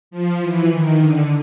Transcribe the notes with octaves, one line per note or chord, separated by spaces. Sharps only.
F3
E3
D#3
D3